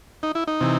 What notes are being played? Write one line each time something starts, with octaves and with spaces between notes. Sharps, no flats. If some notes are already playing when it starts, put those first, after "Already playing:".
D#4
E4
D#4
C3 E3